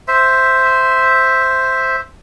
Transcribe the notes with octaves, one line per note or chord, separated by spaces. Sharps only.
C5 E5